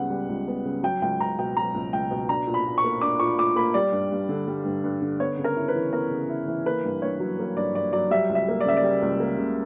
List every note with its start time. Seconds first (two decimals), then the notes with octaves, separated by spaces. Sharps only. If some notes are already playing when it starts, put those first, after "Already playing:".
Already playing: C#2 C#3 G3 B3 F#5
0.10 G3
0.28 C#2
0.48 B3
0.65 C#3
0.83 F#3 G5
1.02 C#2 G5
1.20 C#2 A#5
1.39 B2 G5
1.57 F#3 A#5
1.74 C#2
1.93 C#2 G5
2.11 B2
2.29 D4 A#5
2.47 A#2
2.54 B5
2.66 A#2
2.78 C#6
2.84 A#3
3.01 D4 D6
3.19 A#2 C#6
3.39 A#2 D6
3.56 A#3 B5
3.74 G3 D5
3.92 G2
4.11 G2
4.29 D3
4.48 G3
4.65 G2
4.84 G2
5.02 D3
5.20 B3 C#5
5.38 C#3
5.44 A#4
5.56 E4
5.68 B4
5.75 E3
5.93 B3 A#4
6.11 C#3
6.29 E4
6.48 E3
6.66 A#3 B4
6.84 G2
7.02 G2 C#5
7.20 F#3
7.39 A#3
7.57 G2 D5
7.74 G2 D5
7.93 F#3 D5
8.11 G3 E5
8.29 C#2
8.35 E5
8.48 A#3
8.60 D5
8.65 C#3 E5
8.77 D5
8.84 G3
9.02 C#2
9.20 A#3
9.38 C#3